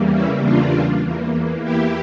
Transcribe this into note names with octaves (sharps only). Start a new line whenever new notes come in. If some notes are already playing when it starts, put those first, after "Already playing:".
Already playing: E2 C#3 E3 G3 A#3
C#4 E4
D4 F4
E2 E3 A#3
E4 G4